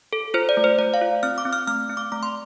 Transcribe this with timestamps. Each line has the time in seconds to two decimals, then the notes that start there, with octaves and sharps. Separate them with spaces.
0.13 A4
0.34 F4 C5
0.49 D5
0.57 A3
0.64 C5
0.78 A3 D5
0.94 F5
1.01 F4
1.23 C4 F6
1.38 D6
1.45 C4
1.53 F6
1.67 A3 F6
1.89 C4
1.97 D6
2.12 A3 D6
2.23 C6